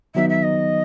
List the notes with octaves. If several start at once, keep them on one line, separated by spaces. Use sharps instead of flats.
D#3 F#3 B3 D#4 E5
E5
D#5